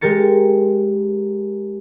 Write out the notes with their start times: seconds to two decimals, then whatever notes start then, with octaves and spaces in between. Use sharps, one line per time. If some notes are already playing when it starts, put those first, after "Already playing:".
0.01 G#3 G4 A#4 A6 C#7